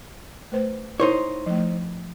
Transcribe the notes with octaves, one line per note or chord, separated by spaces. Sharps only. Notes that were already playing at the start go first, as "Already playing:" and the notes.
A3 B4 C5
D#4 E4 C5 C#5
F3 A3